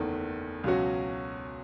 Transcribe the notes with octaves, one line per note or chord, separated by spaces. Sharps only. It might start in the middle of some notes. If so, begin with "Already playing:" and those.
Already playing: F#1 E2 D#3 A3
C#2 B2 F#3 C#4 F#4